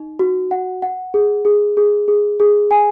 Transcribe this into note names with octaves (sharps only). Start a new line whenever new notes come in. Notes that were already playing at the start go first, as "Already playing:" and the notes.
Already playing: D#4
F#4
F#5
F#5
G#4
G#4
G#4
G#4
G#4
G#5